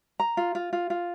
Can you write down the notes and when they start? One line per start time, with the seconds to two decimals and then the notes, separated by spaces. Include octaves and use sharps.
0.20 A#5
0.37 F4
0.55 F4
0.73 F4
0.90 F4